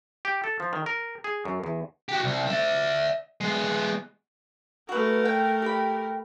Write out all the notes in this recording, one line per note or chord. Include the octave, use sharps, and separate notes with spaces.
G4
A4
F3
D#3
A#4
G#4
F#2
E2
F#4 G4
C2
D5 E5
G#3 B3
A3 F#4 A#4 B4
G5
G4 B5